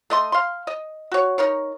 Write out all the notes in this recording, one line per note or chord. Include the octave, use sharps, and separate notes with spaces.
A3 D#5 C6
F5 C6
D#5
F#4 C#5
D#4 A#4 C#5